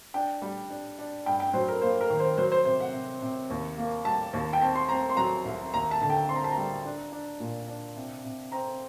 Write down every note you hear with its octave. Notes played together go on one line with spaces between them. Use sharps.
D4 G5
G3
D4
D4
G2 G5
G5
F#3 C5
A#4
A#3 C5
A#4
D#3
C5
F#3 C5
C5
C3 C5
F#5
C3
C3
D#2
A#3
G3 A5
D#2
G5
C4 A5
C6
C4 A#5
C6
F#3 A#5
C2
D#2 A#5
A5
D3 A5
G5
C4 C6
A#5
A5
A#5
G3
D4
D4
A#2
D4
C3
C3
C4 A#5